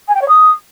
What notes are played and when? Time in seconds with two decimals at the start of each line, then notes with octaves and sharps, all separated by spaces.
0.08 G#5
0.15 G5
0.22 C#5
0.28 D#6